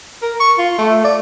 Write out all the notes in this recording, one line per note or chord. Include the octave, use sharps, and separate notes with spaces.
A#4
C#6
F4
A3
D5